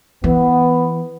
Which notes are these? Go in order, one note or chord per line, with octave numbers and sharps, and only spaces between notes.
E3 B3